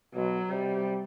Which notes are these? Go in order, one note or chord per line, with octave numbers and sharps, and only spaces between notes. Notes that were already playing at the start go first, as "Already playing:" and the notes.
B2 F#3
C3 G3